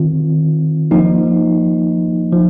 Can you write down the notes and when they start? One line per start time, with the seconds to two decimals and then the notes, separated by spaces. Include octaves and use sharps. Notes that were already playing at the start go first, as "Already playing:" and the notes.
Already playing: D#3 C4 F4
0.91 F3 A#3 D#4
2.32 F3